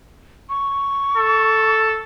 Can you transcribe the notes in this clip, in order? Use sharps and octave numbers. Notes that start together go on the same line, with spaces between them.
C#6
A4